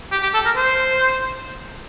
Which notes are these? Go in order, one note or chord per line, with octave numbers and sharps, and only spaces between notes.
G4
G4
A4
A#4
C5